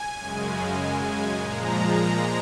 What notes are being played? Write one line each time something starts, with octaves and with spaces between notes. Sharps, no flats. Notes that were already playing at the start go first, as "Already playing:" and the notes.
Already playing: G#5
F#2 C#3 G#3
A#2 F3 G#3 A#5
A#5